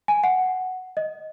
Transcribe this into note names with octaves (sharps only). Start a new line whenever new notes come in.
G#5
F#5
D#5